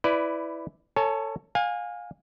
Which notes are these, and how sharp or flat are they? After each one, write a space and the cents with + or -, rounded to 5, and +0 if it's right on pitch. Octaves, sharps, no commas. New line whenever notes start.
E4 +0 B4 +20 D5 +0
A4 +25 C#5 +0 G#5 +45
F5 +25 G#5 -20